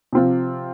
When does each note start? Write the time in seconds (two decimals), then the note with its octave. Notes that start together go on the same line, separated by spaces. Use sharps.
0.13 C3 F3 C4 F4